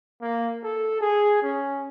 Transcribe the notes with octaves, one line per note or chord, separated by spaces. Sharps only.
A#3
A4
G#4
C#4